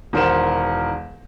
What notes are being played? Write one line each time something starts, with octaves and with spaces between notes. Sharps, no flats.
E1 D#3 A#4 C5 F#5 E7